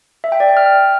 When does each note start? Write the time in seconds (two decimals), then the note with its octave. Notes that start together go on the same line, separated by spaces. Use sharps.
0.24 E5
0.32 G5
0.40 D5
0.48 G5
0.57 F6